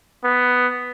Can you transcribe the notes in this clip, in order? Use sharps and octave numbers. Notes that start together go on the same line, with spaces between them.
B3